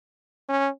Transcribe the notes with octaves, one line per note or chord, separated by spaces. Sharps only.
C#4